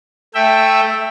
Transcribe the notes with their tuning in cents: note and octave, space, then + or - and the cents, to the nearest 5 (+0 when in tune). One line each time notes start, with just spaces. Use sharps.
A3 +0 E5 +0 G5 +5